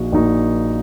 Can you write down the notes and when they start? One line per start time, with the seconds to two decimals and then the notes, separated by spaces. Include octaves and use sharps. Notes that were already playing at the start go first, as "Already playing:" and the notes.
Already playing: A#1 A#2 A#3 D#4 F#4
0.12 A#1 A#2 A#3 D#4 F#4